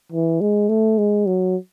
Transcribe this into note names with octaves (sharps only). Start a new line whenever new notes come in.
E3
G#3
A3
G#3
F#3